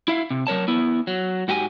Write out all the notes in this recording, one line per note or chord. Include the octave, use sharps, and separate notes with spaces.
E4 E5 F5
C3
F#3 A#4 C#5 A5
B3 E4
F#3
G#2 F#4 G4 G#5